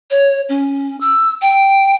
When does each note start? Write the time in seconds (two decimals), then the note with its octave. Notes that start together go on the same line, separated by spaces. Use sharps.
0.11 C#5
0.49 C#4
1.01 E6
1.42 G5